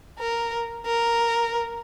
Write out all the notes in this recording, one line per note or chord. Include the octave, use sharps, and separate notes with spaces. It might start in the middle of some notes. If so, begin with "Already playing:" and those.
A#4
A#4